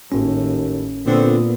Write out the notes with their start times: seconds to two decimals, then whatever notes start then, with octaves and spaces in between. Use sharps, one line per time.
0.12 G#1 D#2 A2 C#4
1.06 A#2 D3 B3 C4